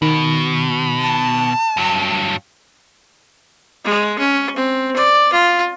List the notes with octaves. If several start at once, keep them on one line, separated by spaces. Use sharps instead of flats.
B2 D#3
A5
G2 F#3
G#3
C#4
C4
D5
F4